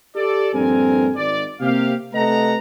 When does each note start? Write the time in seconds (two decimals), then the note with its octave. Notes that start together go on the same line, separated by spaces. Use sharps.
0.15 G4 A4 D5
0.53 A#1 G2 C4 A4 A#4 G#5
1.15 G#1 D5
1.60 C3 A#3 G4 F5
2.13 C3 A3 B4 D#5 F#5 A#5